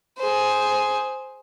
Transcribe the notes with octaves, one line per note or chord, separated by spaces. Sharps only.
G#4 C5